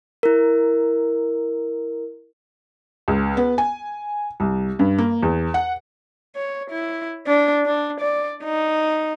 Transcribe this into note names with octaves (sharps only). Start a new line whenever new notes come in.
E4 A#4
C#2
B3
G#5
C2
G2
A#3
E2
F#5
C#5
E4
D4
D4
D5
D#4